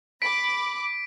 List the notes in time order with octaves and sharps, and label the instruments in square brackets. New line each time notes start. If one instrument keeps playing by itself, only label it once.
[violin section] B5 D6 [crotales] B6 D7